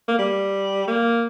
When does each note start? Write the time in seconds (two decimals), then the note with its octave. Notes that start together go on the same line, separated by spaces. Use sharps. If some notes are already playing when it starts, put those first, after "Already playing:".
0.08 A#3
0.19 G3
0.88 A#3